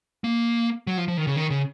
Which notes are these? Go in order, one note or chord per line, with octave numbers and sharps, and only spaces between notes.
A#3
F#3
F3
F3
D#3
C#3
D#3
C#3